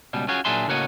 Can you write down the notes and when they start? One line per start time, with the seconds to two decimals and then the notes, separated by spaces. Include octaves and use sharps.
0.13 C#2 B2 G3
0.28 C#4 F4 F#4 G#4 C#5
0.45 A#2 F#3 D4 G#4 E5 C6
0.67 A2 C#3 A#3 F#4 C#5 D#5